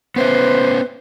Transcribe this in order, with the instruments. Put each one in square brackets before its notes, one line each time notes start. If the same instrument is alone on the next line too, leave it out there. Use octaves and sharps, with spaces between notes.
[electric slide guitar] B3 C#4 E5 [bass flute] B4 [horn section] C5